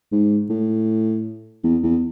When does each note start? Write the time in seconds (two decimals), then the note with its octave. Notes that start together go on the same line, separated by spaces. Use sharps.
0.12 G#2
0.50 A2
1.64 E2
1.83 E2